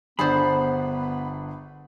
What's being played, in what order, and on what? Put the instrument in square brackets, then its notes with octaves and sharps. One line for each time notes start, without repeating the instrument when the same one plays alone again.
[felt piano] G1 D4 C7 [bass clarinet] B3 [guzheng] G#4 A4 C5 [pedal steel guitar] B5